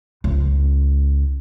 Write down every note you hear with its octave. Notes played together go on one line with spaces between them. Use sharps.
C#2